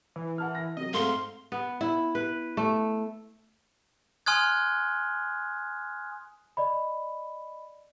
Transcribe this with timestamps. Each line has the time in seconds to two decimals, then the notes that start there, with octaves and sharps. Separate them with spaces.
0.16 E3
0.38 F#5 A5 F6
0.55 A#6
0.77 C3 F#3 D#5
0.94 G#2 A3 C4 F5 C6
1.52 B3
1.81 E4
2.15 B4
2.57 A3
4.26 G#5 C6 D#6 F6 F#6 G#6
6.57 D5 D#5 B5